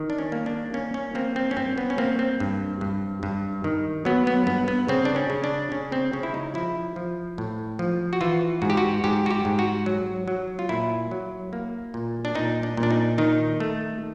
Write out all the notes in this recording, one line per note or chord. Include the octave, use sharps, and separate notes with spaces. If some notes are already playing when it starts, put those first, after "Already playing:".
Already playing: D#3
D4
C#4
A#3
D4
A#3 C#4
C#4
A#3 C4
C4
C#4
G2 C4
B3
C#4
A#3 C4
C4
G2
G2
G2
D#3
F#3 B3
B3
G2 B3
B3
C#3 C4
D4
C#4
C#3
D4
C#3 C#4
C4
C#3 C#4
E4
D#4
F3 E4
F3
A2
F3
F#4
E3 F4
G#2 F#4
G4
F#4
G#2 G4
F#4
G4
G#2
F#4
F#3
F#3
F4
A#2 E4
F#3
A#3
A#2
D4
A#2 D#4
D4
A#2
D4
D#4
D#3 D#4
A3